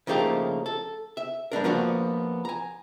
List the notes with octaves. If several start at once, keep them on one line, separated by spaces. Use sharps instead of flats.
C#3 F3 A3 A#3 D#4 G4
A4
E5
G3 B3 D4 A#4
F3 A#3 B3 F#4
G#5 A#5